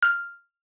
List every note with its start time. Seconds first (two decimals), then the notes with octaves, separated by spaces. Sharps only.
0.03 F6